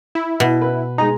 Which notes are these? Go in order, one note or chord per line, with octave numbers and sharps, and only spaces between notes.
E4
B2
B4
G#3 D#4 A#5